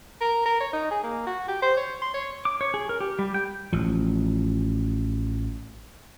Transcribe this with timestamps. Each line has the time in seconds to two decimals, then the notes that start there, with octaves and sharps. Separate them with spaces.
0.21 A#4
0.46 A#4
0.60 C#5
0.73 D#4
0.91 G#4
1.03 A#3
1.27 F#4
1.48 G4
1.62 C5
1.77 C#5
2.02 C6
2.14 C#5
2.45 D6
2.61 C#5
2.74 G#4
2.89 A#4
3.00 G4
3.19 G3
3.34 G5
3.73 A1 F3